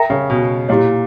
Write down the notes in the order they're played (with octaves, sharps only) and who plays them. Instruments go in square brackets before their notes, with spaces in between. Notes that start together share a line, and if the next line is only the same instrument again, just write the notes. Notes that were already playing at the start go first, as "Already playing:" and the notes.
Already playing: [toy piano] A#4 E5 G5 A#5
[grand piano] C#3
B2
[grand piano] A#2 [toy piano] E4 G4 C#5